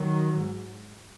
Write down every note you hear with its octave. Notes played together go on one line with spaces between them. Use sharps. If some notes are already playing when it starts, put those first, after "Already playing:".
Already playing: D#3 F#3
G#2